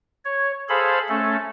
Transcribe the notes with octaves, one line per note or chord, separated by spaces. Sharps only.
C#5
G#4 A4 C5 F5 B5
A3 C#4 A4